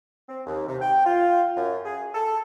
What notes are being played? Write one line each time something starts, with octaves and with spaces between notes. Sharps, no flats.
C4
D#2
C3
G5
F4
F#2
G#4
A4